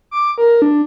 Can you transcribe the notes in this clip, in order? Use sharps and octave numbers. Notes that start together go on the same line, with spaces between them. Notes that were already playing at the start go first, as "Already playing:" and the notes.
D6
A#4
D4